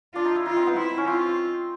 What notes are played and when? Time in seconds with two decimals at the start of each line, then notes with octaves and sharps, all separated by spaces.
0.14 D4 F4
0.25 D#4
0.36 E4
0.46 D#4 F4
0.57 C4
0.66 B3
0.76 C4 E4
0.97 C#4
1.07 C4 F4